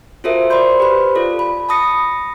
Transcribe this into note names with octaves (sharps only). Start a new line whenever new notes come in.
F4 F#4 A4 A#4 C5 E5
C5 D5 B5 C6 G6
G4 B4 C5 B5 F#6
F4 A4 D5
B5
A5 B5 D#6 A#6 C#7